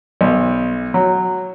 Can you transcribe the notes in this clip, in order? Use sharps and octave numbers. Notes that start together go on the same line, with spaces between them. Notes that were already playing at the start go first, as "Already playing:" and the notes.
B1
F#3